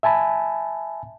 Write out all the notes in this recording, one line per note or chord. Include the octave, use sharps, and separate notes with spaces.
E5 G#5 A5 B5